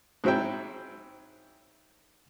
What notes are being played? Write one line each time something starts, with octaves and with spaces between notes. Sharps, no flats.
G#2 F#3 C4 E4 G5